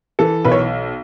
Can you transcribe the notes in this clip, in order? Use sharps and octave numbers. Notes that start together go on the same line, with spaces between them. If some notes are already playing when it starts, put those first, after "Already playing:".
E3 A4
B1 B4
C#5